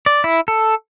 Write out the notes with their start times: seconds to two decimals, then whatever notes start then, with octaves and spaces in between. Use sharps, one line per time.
0.06 D5
0.24 E4
0.48 A4